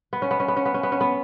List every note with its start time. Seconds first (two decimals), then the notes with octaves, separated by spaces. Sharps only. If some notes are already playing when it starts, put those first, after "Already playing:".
0.13 B3
0.22 C#4
0.31 B3
0.40 C#4
0.48 B3
0.56 C#4
0.65 B3
0.74 C#4
0.83 B3
0.92 C#4
1.01 B3